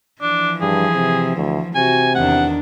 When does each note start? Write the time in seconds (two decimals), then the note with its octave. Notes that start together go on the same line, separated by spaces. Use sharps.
0.22 E3 F3 D4
0.61 G2 G#4
0.94 C3
1.37 D2
1.75 C3 F#4 G#5
2.15 E2 D#3 D4 F#5